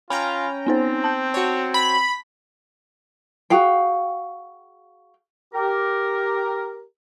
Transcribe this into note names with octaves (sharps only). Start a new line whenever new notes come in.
C#4 F4 G5 G#5 A#5 B5
B3 C4 D#4 C5
A5 G6
F#4 C#5
B5
F#4 G#4 F5 G5
G4 A#4